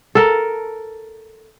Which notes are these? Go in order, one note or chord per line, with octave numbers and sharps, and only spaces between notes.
A4 A#4